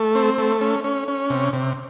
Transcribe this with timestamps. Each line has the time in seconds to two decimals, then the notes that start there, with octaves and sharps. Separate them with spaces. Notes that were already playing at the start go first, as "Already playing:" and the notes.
Already playing: A3
0.15 C4
0.38 A3
0.61 C#4
0.84 C#4
1.08 C#4
1.30 C3
1.53 C3